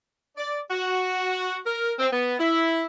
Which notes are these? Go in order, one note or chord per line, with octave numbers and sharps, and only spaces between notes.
D5
F#4
A#4
C4
B3
E4